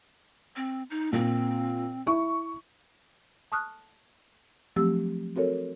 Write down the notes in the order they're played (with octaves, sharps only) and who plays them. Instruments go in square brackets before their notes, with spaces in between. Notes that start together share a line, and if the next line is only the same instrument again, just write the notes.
[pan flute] C4
D#4
[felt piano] A#2 [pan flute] C4
[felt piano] E4 C#6
[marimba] A5 C#6 D#6 F6 F#6
F3 F#3 A3 C4 G4 E6
C4 F#4 A4 A#4 C#5